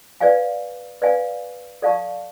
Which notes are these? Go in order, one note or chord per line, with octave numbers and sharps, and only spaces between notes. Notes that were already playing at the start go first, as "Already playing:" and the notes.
B4 D5 F5 G#5
B4 D5 F5 G#5
A4 D5 F5 A5 C#6